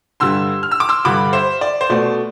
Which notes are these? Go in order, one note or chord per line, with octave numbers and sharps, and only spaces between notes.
G2 D3 G3 C6 E6
F6
E6
D6
C6 E6
G2 D3 G3 B5 D6
C5 E5
D5
C5
B2 A3 D5